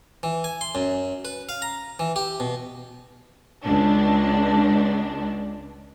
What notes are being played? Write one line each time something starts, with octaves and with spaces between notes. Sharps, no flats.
E3
G#5
C6
F#2
B4
F5
A#5
E3
G4
B2
C#2 D4